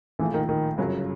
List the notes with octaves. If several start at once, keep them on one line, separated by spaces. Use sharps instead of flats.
A#1 A2 E3 F3
D#3
D#3
G1 F#2 C#3 F#3